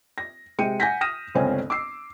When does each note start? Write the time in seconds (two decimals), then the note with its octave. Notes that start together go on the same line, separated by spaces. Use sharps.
0.18 A#6
0.58 C3 G#3 G5 C#7 D#7
0.80 F#5 G#5 G6 A#6 B6
1.01 D#6 F6 A#6 D#7 E7
1.35 G1 C#2 C4 C#4 G#5
1.70 D6 E6 C7